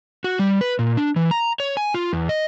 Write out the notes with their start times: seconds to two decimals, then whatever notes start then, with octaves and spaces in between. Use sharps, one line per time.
0.24 F#4
0.39 G3
0.61 B4
0.79 A#2
0.97 D4
1.16 E3
1.31 A#5
1.60 C#5
1.77 G#5
1.94 F4
2.13 E2
2.29 D#5